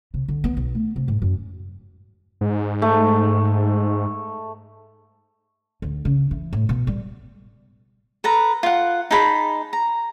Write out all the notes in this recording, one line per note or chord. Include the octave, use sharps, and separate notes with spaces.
C3
D3
B3
B1
A3
C3
G#2
F#2
G#2
A3
D2
C#3
E3
A2
B2
G3
A4 B4 A#5
F4 F#5
D#4 G#4 A5 B5
A#5